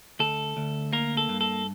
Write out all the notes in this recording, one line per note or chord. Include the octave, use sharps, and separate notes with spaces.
D2 A4
D2
A#3 A#4
A4
G2
A4